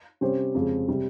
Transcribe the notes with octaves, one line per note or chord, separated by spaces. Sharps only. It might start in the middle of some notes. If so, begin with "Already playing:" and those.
C3 G3 C#4 G4 C5
F2 C#3 G#3
C3 G3